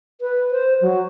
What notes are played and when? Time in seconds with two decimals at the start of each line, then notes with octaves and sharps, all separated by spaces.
0.21 B4
0.51 C5
0.81 F#3